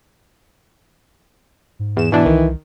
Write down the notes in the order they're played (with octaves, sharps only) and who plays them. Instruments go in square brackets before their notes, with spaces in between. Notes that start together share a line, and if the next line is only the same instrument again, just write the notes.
[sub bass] G#2
[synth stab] E2 E7
[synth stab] B2 D4 [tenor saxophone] E3
[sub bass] C2 [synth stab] D#3